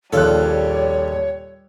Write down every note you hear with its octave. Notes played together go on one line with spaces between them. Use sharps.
A#1 D#2 G3 F4 A4 C#5 F#6